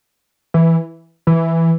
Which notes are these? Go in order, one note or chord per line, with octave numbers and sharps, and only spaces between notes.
E3
E3